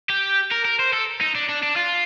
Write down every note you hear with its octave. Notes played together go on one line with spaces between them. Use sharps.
G4
A#4
A#4
C5
A4
D#4
D4
D4
D4
F4